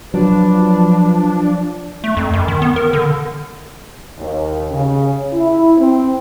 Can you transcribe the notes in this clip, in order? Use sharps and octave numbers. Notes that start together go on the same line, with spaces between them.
F3 F#3 D4 B4
A3
F2
F#2
D#3
B3
A#4
D3
D#2
C#3
E4
C4